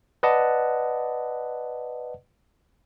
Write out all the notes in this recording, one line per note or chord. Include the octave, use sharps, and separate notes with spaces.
B4 D5 D#5 F#5 A5